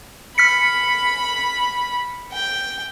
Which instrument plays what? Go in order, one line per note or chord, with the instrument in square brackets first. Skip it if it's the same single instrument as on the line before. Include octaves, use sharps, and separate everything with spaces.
[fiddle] B5 [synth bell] F6 B6 C#7
[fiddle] G5